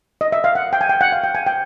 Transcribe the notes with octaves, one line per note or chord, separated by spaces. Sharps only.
D#5
E5
F5
F#5
G5
G#5
G5
F#5
F5
G5
G#5
G5